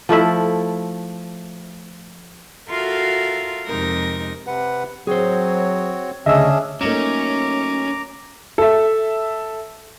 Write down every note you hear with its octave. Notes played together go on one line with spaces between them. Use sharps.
F3 A3 E4 E5
F4 F#4 A4 A#4 E5 F5
F2 C3 G#3 D#4 A#4 A#6
C3 B4 F#5
F#3 C4 F#4 G#4 C5 C#5
D2 C#3 C#4 D4 G#4 D#5 E5 E6
F#3 A3 A#3 C#4 D#4 A#5 D6 E7
A4 E5